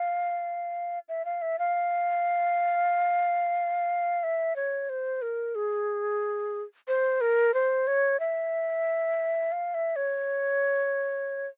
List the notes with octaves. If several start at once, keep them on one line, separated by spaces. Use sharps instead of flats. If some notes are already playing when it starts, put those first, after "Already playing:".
Already playing: F5
E5
F5
E5
F5
E5
C#5
C5
A#4
G#4
C5
A#4
C5
C#5
E5
F5
E5
C#5